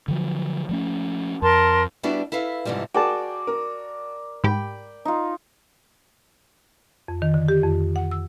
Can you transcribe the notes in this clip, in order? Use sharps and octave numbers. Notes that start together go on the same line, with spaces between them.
D3 F3 F#3
F3 A3 C#4
F2 A#4 A5 C6
G3 B3 D4 E4 F#4
E4 A4 B4 F5
G#2 C3 E3 F3 G3
F#4 G#4 A#4 D5 G5 A5
A#4
G#2 G4 G5 B5
D#4 F4
F2
D#3
D3
G4
F2
F#5
E6